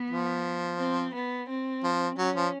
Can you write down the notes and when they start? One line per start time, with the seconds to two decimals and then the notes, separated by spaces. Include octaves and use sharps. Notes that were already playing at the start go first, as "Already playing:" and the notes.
Already playing: B3
0.10 F3
0.79 C4
1.15 B3
1.49 C4
1.84 F3
2.18 F#3 C#4
2.36 F3